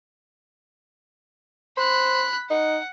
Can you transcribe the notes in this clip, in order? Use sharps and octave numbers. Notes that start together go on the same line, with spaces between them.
C5 B5 F#6
D#4 F#5